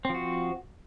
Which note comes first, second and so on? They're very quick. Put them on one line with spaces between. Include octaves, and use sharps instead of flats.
C4 F3 F#4